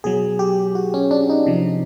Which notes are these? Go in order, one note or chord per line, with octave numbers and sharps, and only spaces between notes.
B2 F#3 G#4
G4
F#4
C#4
D4
D#4
C3 F3